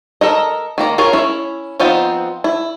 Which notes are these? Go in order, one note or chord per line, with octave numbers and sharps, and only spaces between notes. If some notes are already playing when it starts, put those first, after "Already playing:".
A4 A#4 D#5
D#3 A#3 A#5
F4 G#4 A#4 C#5
C#4 E4 C#5
F3 B3 C4 D#4 F4
E4